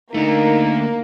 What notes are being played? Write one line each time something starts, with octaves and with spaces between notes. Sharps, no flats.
D3 A3 A#3 D#4